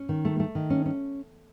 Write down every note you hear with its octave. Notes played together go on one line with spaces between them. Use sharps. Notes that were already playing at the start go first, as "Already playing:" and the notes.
Already playing: C#4
D#3
A3
A3
D#3
C#4
C#4